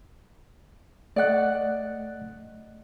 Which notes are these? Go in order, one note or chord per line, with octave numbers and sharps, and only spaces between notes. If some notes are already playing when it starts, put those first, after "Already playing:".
A3 D5 D#5 F#5 F#6